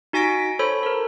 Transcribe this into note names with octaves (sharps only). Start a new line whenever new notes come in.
D#4 F#4 G#5 A#6 B6 D7
A4 C5 C#5 B5
A4 A#4